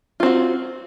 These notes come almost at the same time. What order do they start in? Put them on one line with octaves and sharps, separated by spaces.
F4 C4 F#4